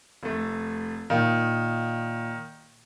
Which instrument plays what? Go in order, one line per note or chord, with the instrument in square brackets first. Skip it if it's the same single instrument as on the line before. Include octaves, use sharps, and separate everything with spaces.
[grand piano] F1 A3
[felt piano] A#2 F5 [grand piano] D#3